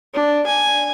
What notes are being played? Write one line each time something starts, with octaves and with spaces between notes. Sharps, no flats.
D4
G#5